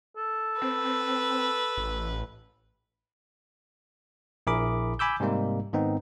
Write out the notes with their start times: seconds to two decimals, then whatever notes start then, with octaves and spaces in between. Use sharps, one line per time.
0.17 A4
0.62 C4 B4
1.77 A1
4.47 A#1 E4 G#4 A#4 B5 D6
4.99 G#5 B5 D6 E6 G6
5.20 G#2 C3 G3 A#3 D#4
5.73 G#2 D#3 B3 C4 D#4